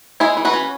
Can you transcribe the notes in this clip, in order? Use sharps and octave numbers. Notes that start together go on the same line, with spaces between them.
G#3 E4 G#4
E3
F#4 B4
C#4